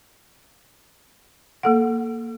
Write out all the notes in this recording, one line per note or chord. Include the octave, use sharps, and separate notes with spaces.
A#3 A4 F#5